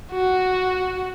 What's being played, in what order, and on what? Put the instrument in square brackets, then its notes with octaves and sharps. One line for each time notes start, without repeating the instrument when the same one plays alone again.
[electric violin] F#4